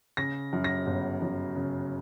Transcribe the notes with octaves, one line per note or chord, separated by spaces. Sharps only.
C#3 A#6
F#2
A#6
G1
F#2
C#3